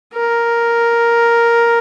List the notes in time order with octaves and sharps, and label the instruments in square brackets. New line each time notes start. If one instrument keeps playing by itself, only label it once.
[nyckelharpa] A#4